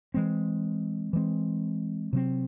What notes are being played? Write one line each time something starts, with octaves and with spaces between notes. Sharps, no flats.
E3 G#3 C4
E3 G#3 C4
C3 F#3 C4